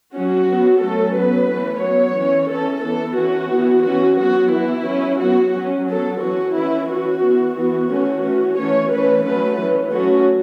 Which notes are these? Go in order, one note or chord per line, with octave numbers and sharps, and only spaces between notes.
F#3 C#4 F#4
F#3 B3
F#3 A3 C#4 A4
F#3 B3 B4
E3 A3 C#4
F#3 B3 C#5
E3 C#4
E3 C#4 A4
E3 B3 A4
E3 C#4 F#4
E3 B3
E3 C#4 F#4
F#3 B3 F#4
E3 B3 E4
F#3 C#4
F#3 B3 F#4
F#3 C#4
F#3 B3 A4
E3 C#4 F#4
E3 C#4 E4
E3 C#4 F#4
E3 B3
E3 B3 F#4
E3 A3 C#4
E3 C#4
E3 A3 C#4 C#5
E3 A3 C#4 B4
F#3 A3 C#4 B4
E3 C#4
F#3 A3 C#4 F#4